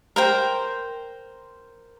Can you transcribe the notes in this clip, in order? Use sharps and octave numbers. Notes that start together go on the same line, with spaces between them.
A#4 C5 G5